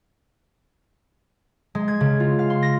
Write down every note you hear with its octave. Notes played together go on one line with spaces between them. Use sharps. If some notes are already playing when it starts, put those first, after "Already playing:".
G#3
G#6
C#3
F4
F5
C6
A#6